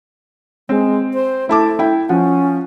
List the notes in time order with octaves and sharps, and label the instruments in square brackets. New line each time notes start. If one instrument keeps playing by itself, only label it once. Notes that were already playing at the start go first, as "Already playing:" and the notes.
[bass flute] G#3 [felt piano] C4
[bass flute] C5
[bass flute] A3 [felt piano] E4 A5 D6
[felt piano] E4 G5
[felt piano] F3 F#5 [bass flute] C#4